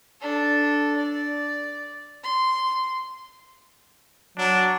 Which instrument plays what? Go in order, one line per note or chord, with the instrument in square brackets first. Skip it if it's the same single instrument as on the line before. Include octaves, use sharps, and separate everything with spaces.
[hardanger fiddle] D4 A4
D5
C6
[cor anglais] F#3 [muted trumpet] D4